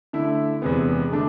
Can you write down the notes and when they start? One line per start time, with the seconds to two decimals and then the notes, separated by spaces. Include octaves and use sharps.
0.13 D3 A3 E4
0.62 E2 C3 G#3 B3
1.11 D3 A3 D4